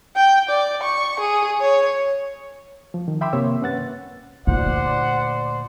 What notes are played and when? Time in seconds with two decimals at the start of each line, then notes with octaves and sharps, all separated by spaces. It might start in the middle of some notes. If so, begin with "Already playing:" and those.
0.16 G5
0.50 D5
0.83 C#6
1.20 G#4
1.61 C#5
2.94 F3
3.08 D#3
3.21 E5 G5 B5 C6 D6 E6
3.33 C3 A#3 C#5 E6
3.62 C#4 B4 F#5 A6
4.47 D2 A#2 D#4 C5 D5 F#5